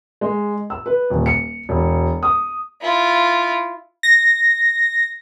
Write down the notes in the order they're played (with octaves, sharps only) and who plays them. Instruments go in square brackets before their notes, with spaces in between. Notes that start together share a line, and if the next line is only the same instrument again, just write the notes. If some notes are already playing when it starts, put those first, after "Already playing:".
[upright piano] G#3
E6
B4
D#1
C#7
E1
D#6
[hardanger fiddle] E4 F4
[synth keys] A#6